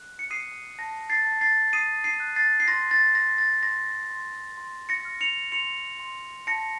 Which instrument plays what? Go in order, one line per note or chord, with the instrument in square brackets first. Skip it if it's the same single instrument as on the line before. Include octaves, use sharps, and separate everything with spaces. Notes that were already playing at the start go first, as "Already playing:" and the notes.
Already playing: [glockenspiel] F#6
C#7
D#6 C7 D#7
A5 A#6
A6 C7
A5
A6 C7
D#6 C7 D#7
C7 D#7
F#6
A6 C7
C7
C6 A#6
A6
C6 A#6
A6
C6 A#6
C6
C6
A#6 C#7
F6
C#7 F7
C6 C#7 F7
C6
A5 A#6 C#7